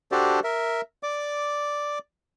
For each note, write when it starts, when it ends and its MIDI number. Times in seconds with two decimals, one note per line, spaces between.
0.12 0.40 62
0.12 0.40 66
0.12 0.40 67
0.12 0.40 69
0.12 0.40 72
0.12 0.40 74
0.44 0.81 70
0.44 0.81 76
1.03 1.99 74
1.03 1.99 86